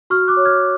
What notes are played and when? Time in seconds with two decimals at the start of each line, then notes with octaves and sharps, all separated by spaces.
0.10 F#4 C#6 F6
0.28 D6 F#6
0.37 C#5
0.45 F6 G#6